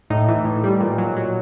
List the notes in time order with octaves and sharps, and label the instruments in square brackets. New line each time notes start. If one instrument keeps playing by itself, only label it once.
[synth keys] A2 D#4
E3
A2
G3
A#2
F#3
F#3